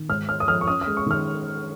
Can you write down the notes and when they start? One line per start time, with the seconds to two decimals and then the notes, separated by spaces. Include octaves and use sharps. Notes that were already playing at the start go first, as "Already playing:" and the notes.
Already playing: D#3
0.09 G#2 F6
0.29 G#3 F6
0.40 D#6
0.48 F3 F6
0.61 C#6
0.67 C#4 D#6
0.81 D#6
0.87 G#3
0.97 C#6
1.06 D#3 F6